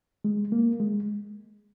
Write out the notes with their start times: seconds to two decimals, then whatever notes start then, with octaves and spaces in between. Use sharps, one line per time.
0.25 G#3
0.52 A#3
0.80 G#3